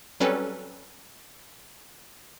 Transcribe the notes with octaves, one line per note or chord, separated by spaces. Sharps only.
F#3 G3 C4 C#4 A4 B4